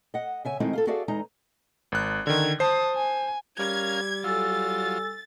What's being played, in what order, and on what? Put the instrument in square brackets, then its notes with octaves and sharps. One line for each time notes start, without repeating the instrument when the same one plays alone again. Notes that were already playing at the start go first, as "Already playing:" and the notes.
[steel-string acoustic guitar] D#5 F#5
C#3 E5 G#5
D#3 G#3 A3 C4 D#4 E4
F4 G#4 A4
F#4 G#4 A4 D5 E5 F5
E2 G#3 D#4 A#5
[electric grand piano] G#1 F#6
[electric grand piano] D3 D#3 [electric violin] G#6
[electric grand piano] C5 C7 [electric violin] A5 D#6
[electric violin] G#5
[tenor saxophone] G3 [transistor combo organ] C#4 A#4 F5 [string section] G#6
[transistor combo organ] F#3 F4 [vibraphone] A4 G#5 E6 [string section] A6